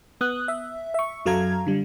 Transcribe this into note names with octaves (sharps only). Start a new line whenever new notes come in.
B3 D#6 F#6
E5
E5 C#6
F#2 F#3 A4 F5 A#5 G#6
D3 G3